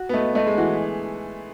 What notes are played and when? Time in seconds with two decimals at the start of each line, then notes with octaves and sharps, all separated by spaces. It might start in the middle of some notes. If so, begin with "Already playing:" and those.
Already playing: F#4
0.09 B3
0.14 A3 D#5
0.35 A3 D#5
0.47 G#3
0.58 E3 F#4